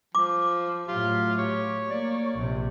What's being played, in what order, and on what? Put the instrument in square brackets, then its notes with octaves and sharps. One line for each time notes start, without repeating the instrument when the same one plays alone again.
[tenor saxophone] F3 [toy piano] D6
[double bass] A2 F#3 [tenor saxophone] F4 [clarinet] G4
[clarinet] G4 [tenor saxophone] C#5
[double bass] A#3 [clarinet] D5
[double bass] A#1 C3